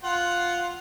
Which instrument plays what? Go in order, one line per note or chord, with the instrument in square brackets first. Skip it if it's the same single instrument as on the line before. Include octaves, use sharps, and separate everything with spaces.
[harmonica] F4 F#5